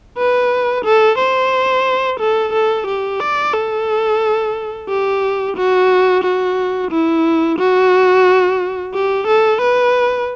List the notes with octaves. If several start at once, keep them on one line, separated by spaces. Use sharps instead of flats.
B4
A4
C5
A4
A4
G4
D5
A4
G4
F#4
F#4
E4
F#4
G4
A4
B4